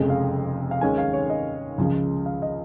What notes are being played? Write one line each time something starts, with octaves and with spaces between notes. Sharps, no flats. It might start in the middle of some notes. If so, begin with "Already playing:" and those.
Already playing: F1 F2 C#3 G#3 D#5
F5
F5
D#2 D#3 G#3 C#4 G#5
F5
C#5
D#5
C#2 C#3 F3 G#3
F5
D#5